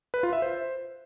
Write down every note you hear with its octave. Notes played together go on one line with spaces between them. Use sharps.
B4
F4
E5
C5